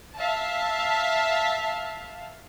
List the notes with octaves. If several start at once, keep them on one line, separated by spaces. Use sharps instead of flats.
E5 F5 A5